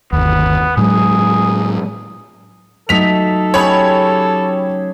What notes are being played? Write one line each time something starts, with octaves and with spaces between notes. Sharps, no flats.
G1 D#2 B3
A2 F#3 G#3 G#4
F#3 A3 D#4 A4 B6 F7
C#3 G4 G#4 C#5 B5